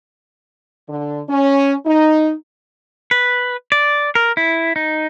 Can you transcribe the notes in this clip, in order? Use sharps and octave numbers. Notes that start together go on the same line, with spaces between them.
D3
C#4
D#4
B4
D5
A#4
E4
D#4